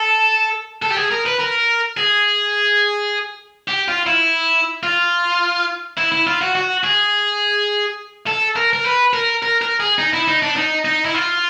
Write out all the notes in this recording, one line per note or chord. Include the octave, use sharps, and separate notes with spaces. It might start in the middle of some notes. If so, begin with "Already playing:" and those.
Already playing: A4
A4
G4
G#4
A#4
B4
A#4
G#4
G4
F4
E4
F4
E4
E4
F4
F#4
F#4
G#4
A4
A#4
A#4
B4
A#4
A#4
A#4
G#4
D#4
E4
D#4
D4
D#4
D#4
E4
F4